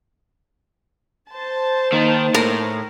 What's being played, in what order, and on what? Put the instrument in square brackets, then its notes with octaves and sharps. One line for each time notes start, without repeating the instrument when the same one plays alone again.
[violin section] C5 A5
[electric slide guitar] D#3 [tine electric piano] A#3 D#4
[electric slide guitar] A2 [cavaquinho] A#4